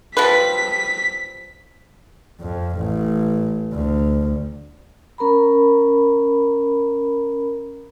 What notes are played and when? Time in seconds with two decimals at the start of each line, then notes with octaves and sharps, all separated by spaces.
0.17 F3 G3 B4 B6
2.41 F2
2.77 A1
3.73 D2
5.18 C#4 A#4 A#5 B5